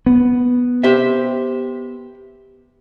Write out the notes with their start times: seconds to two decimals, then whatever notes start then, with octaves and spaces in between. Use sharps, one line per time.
0.06 B3
0.84 G4 C5 E5